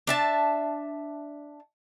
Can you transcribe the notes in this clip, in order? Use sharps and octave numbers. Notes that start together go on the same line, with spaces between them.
D4 E5 A5